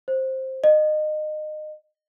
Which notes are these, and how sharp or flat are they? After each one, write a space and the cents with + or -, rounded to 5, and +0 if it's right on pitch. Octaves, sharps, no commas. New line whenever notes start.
C5 +10
D#5 -25